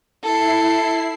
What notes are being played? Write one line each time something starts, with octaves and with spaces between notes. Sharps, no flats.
E4 A4 C7